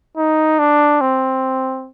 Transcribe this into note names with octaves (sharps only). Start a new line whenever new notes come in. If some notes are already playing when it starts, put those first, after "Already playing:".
D#4
D4
C4